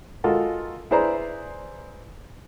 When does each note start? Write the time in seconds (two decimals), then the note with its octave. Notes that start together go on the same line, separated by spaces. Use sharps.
0.24 G#3 F4 F#4 A4 A#4
0.91 E4 G#4 B4 C5 D5 A#5